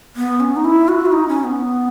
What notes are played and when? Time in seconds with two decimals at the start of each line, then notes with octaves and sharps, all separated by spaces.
0.16 B3
0.40 C#4
0.56 D#4
0.64 E4
0.88 F#4
1.06 E4
1.12 D#4
1.28 C#4
1.44 B3